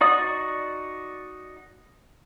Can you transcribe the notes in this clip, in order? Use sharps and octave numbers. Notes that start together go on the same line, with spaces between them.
D#4 F#4 D5 D#6